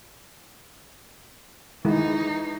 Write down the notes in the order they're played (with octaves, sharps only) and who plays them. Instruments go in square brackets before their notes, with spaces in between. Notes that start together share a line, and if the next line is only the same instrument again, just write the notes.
[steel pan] D#3 G#3 E4 [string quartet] E3 D#4